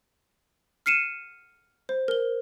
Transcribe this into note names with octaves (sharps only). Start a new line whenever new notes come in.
F6 C7 C#7 D#7 E7
C5
A#4 G7